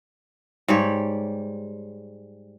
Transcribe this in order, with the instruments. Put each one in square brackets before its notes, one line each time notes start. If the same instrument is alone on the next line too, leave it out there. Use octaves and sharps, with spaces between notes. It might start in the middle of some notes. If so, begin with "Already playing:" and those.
[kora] G#2 G3 C#5